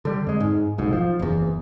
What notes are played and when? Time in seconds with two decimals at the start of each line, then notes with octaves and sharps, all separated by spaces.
0.05 D3 G3
0.27 F2 G#3
0.40 G#2
0.78 F1 B1 G#2
0.93 F3
1.19 F#1 E2